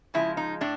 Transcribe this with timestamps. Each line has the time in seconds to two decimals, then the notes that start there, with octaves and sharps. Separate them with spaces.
0.14 C#3 F3 G#3 E4
0.37 D#4
0.61 A2 D4